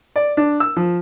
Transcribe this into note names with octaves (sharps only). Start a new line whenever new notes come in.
D5
D4
E6
F3